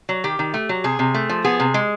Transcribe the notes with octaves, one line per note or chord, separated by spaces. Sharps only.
F#3
D#3 G4
D#3
A3
F#3
C3 G#4
C3
A3
F3
B3 G#4
C3
G#3